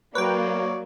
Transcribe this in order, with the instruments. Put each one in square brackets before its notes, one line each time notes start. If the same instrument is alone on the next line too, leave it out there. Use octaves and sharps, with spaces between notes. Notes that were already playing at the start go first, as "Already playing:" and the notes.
[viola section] F#3 [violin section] A#3 [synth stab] B4 G5 [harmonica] C#5 D5